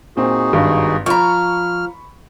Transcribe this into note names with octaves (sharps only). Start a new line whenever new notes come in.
A#2 C4 D#4 F#4 G#4
G#1 G2
F3 A#5 B5 C#6 F6